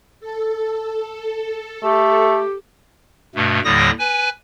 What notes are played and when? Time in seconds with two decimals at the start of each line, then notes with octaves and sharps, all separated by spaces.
0.20 A4
1.83 A3 G4
3.35 G2 B2 A3
3.64 D#2 A2 D3 G3 D#6 A#6
3.99 B4 G#5